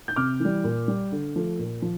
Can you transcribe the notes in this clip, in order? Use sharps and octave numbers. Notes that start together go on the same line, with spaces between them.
G6
C3 D6 F6
E3 G3
A#2
G3
D3
F3 A3
A#2
F3